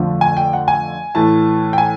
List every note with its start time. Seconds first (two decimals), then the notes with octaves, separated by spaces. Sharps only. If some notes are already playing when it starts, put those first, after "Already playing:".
Already playing: F2 D3 F3 A3
0.21 G#5
0.37 G5
0.53 F#5
0.68 G#5
1.15 A2 E3 A3 A5
1.73 G5
1.78 G#5